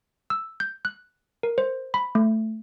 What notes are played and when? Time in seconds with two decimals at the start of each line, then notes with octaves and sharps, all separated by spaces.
0.30 E6
0.60 G6
0.85 F#6
1.43 A#4
1.58 C5
1.94 B5
2.15 A3